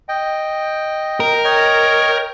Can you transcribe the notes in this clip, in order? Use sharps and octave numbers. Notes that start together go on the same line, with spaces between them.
D#5 G5
A#4
C#5 D#5 G5